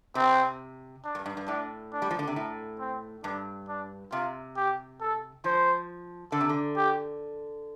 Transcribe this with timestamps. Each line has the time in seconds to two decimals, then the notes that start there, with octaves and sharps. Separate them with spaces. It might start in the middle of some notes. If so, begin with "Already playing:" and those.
0.15 C3 C4
1.04 D4
1.15 G2
1.26 G2
1.37 G2
1.48 A2 D4
1.92 D4
2.02 G3
2.11 F3
2.19 D3
2.27 C3
2.36 A2
2.80 C4
3.24 G2 D4
3.68 D4
4.12 C3 F4
4.56 G4
5.00 A4
5.44 F3 C5
6.32 D3 A4
6.41 C3
6.49 D3
6.77 G4